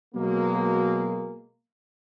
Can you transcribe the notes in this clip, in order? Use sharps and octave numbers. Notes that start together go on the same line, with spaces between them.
B2 F#3 G#3 A#3